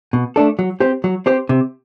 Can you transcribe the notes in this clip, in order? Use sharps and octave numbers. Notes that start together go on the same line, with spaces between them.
B2
A3 D4 A4
F#3
C4 G4 C5
F#3
C4 G4 C5
C3